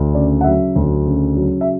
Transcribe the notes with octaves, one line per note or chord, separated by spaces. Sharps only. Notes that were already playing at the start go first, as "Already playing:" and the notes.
Already playing: D2
C#3 D5
F#5
F#3 E5
D2
C#3
F#3
E5